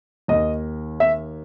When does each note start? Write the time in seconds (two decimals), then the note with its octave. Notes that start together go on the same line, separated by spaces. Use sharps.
0.28 D#2 D#3 D#5
1.00 E5